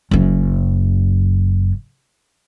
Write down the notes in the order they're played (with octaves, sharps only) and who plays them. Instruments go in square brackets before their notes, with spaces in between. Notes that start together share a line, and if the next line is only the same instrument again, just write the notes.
[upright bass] F#1 F#2